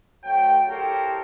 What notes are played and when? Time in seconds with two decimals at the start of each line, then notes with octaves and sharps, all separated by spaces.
0.24 D2 F#3 A3 G5
0.69 E4 G4 A4 A#4 C5 C#5